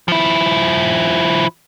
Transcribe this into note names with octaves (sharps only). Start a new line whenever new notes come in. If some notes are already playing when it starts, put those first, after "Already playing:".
F3 E4